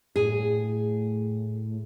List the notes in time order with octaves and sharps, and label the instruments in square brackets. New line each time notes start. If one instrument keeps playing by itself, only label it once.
[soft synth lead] A2 [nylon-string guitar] G#4